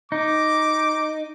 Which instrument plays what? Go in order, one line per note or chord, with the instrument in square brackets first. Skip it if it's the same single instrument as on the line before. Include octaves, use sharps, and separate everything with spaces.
[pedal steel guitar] D#4 [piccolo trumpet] D6